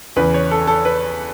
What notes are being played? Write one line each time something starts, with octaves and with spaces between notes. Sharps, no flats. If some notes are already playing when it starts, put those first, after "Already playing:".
E2 C#3 E3 B4
C#5
A4
A4
B4